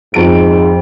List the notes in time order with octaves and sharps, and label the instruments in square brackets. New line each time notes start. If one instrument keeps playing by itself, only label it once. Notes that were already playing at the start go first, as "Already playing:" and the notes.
[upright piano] F2 D7 [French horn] G#2